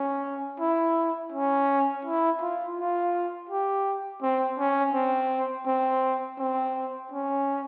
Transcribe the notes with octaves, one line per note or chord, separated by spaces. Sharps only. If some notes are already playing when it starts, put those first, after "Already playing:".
Already playing: C#4
E4
C#4
E4
F4
F4
G4
C4
C#4
C4
C4
C4
C#4